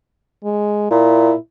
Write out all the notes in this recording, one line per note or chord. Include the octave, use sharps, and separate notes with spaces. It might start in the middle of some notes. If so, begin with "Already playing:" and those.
G#3
A#2 E4